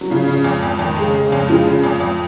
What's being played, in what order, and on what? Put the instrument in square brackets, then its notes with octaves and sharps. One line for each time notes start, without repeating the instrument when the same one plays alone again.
[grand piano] F#3
[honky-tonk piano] C#3 [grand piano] F3
[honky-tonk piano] C#3
F2
F2
[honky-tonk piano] F2 [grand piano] D#3
[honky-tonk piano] G#3
[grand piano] C#3
[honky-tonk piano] G#3
[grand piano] C#3
[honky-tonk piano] F2
[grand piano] F3 [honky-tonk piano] G#3
[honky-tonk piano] C#3
F2
F2